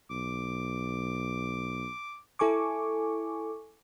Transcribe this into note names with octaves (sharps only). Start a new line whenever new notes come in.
B1 D6
E4 A4 G#5 C#6 D6